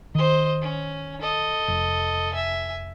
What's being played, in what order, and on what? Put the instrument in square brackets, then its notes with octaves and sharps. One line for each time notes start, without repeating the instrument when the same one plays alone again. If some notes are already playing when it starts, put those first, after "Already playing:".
[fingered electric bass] D#3 [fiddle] C5 D#5
[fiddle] C#4
A4 D#5
[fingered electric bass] F1
[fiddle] E5 G#5